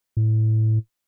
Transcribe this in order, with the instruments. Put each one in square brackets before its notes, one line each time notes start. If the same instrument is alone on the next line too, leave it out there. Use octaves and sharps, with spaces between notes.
[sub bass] A2